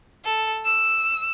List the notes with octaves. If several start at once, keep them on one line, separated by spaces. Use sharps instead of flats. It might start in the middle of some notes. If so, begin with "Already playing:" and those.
A4
E6